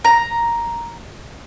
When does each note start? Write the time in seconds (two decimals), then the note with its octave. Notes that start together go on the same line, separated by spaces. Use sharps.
0.05 A#5